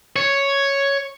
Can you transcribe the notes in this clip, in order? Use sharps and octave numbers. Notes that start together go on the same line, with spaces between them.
C#5